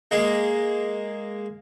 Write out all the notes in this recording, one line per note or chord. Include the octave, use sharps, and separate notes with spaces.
G#3 A#3 G#4